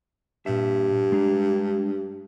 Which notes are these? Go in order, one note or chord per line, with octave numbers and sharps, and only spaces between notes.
G2 A#2 E5
G#3 D4 A#5